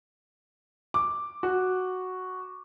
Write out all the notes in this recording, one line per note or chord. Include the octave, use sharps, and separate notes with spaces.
D6
F#4